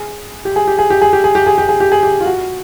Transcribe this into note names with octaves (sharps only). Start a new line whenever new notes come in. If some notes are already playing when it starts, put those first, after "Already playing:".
Already playing: G#4
G4
G#4
G4
G#4
G4
G#4
G4
G#4
G4
G#4
G4
G#4
G4
G#4
G4
F4
F#4